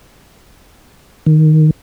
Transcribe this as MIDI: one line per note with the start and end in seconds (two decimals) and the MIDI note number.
1.26 1.71 51